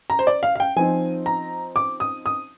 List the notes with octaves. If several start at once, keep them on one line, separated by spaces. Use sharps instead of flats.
A#5
C5
D5
F5
F5
G5
F3 C4 D#4 G#5
A#5
D6
D#6
D#6